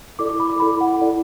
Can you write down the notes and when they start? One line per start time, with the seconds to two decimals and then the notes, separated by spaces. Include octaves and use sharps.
0.19 E4 A4 D5 D6
0.29 D6
0.40 B5
0.50 D6
0.60 E4 A4 D5 B5
0.81 F#5
1.01 E4 A4 D5